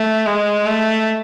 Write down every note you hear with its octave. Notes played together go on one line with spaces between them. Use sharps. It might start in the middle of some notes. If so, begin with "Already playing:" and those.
Already playing: A3
G#3
A3